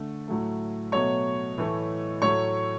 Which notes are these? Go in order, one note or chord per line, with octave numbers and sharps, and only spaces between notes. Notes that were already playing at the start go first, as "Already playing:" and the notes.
Already playing: D3 A3
A2 F#3 A3
B2 F#3 A3 C#5 C#6
A2 E3 A3
A2 F#3 A3 C#5 C#6